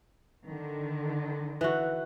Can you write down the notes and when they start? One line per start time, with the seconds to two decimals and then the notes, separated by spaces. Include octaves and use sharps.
0.45 D3 D#3
1.61 E3 F#4